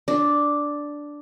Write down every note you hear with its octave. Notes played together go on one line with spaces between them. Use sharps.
D4